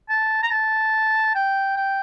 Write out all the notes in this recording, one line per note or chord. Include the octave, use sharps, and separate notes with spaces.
A5
A#5
A5
G5
G5